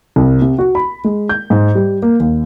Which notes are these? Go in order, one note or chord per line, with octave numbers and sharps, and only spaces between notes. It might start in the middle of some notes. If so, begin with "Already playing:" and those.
C2
C3
F#4
B5
G#3
G6
G#2
G3
A#3
D#2